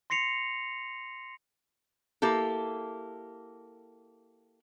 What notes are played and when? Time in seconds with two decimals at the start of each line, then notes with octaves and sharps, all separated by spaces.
0.10 C6 A#6 C7 C#7 F7
2.22 A#3 E4 G4 A4